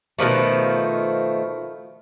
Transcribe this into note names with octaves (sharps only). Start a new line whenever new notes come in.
B2 D#3 F3 A3